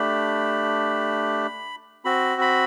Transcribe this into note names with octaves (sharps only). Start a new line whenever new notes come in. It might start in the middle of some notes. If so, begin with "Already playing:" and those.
Already playing: A3 D4 G4 B5
C4 F#4 B5
B5